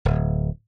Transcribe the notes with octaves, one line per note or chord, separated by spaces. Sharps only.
D1